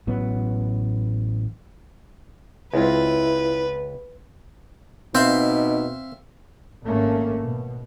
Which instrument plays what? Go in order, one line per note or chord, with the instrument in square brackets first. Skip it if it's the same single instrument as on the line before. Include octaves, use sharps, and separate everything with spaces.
[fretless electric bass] A1 F#3 B3
[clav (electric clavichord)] C#2 [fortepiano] G#3 C4 F4 [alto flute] E4 [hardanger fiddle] B4
[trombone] B2 [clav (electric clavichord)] C4 [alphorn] D#4 [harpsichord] E5 F5 C6
[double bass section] G#1 A3 A#3 C#4
B2